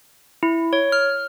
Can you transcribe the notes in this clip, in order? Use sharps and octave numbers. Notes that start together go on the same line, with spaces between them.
E4
C#5
F6